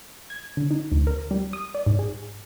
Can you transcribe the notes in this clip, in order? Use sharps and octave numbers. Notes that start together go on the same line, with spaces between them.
G#6
D3
D#4
D2
A#4
G3
D#6
D5
G#2
G#4